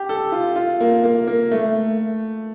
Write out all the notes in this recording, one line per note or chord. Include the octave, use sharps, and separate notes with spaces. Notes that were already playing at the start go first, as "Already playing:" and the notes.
Already playing: G4
A4
F4
F4
A#3
A#3
A#3
A3